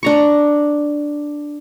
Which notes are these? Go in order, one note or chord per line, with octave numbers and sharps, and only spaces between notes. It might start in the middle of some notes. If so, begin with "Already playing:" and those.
D4 A#5 C#6